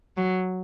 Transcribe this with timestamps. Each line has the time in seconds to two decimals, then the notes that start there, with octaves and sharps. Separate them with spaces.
0.17 F#3